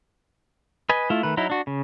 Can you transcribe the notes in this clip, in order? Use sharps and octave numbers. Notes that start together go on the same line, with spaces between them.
B4 D#5 G#5
A3 E4 F4
D#3 A3 B4
F#3 D#4 E4
D4 F#4
C#3